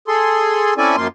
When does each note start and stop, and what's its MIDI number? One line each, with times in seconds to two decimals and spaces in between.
0.08 0.74 68
0.08 0.74 69
0.08 0.74 84
0.78 0.96 60
0.78 0.96 61
0.78 0.96 64
0.78 0.96 69
0.78 0.96 74
0.78 0.96 80
0.97 1.08 42
0.97 1.08 53
0.97 1.08 58
0.97 1.08 65
0.97 1.08 84